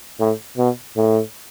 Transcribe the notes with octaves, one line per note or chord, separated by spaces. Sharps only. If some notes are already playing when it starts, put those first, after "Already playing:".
A2
B2
A2